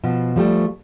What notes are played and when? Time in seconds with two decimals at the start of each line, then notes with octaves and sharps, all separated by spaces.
0.04 B2 F3
0.36 F3 G3 A3 G4